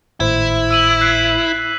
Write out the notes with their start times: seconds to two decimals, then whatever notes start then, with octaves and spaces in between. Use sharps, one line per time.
0.20 G#1 A2 E4 C5
0.71 E6 D#7 F#7
1.01 F#6 B6 C7